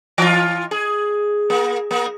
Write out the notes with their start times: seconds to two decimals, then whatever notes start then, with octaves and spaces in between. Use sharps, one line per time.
0.18 E3 F4
0.71 G#4
1.50 A#3
1.91 A#3